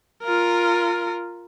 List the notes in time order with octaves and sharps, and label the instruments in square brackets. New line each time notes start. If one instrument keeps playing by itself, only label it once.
[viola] F4 A#4